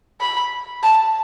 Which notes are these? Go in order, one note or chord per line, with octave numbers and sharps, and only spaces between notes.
B5
A5